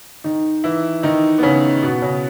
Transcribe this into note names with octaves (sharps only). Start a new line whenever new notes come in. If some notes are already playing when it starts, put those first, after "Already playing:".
D#3 D#4
E3 E4
D#3 D#4
B3
C#3 C#4
B2 B3
C#3 C#4